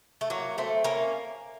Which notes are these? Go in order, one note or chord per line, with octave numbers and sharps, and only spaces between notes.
A3
F#3 A#3
A3 C4
A#3 C#4